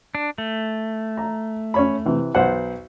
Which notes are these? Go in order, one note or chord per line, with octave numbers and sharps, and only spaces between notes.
D4
A3
A#5
C#4 C#5 B5
C3 E3
B1 C5 F#5